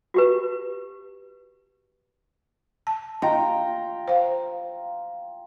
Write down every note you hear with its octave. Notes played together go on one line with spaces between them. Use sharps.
F#4 G4 B4
A5
F4 D#5 G5 A#5
C5 F5